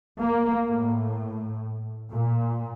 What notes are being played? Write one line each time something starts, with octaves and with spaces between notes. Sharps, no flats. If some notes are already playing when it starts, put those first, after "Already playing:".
A#3
A2
A#2